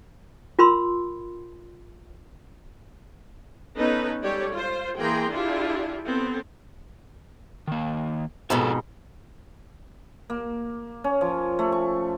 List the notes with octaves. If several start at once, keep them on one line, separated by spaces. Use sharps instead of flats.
F4 A#4 B5 C6 E6
B3 C#4 D#4 A4 B4
G3 G#3 G4 A4 C#5 D5
F4 C5
E3 A#3 G#4 G5 A#5 C6
D4 E4 F4 G4 G#4
B3 C4 A4
D#3 A#3
F2 G#2 B2 F#4 A4 B4
A#3
C#4
F3
A3
C#6